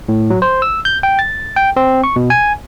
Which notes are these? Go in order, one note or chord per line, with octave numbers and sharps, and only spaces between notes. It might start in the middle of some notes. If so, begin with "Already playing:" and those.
A2
F#3
C5
E6
G6
G5
A6
G5
C4
C#6
B2
G#5